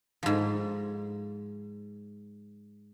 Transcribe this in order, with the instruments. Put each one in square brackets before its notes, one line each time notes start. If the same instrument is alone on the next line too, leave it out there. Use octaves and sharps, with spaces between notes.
[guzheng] G#2 F3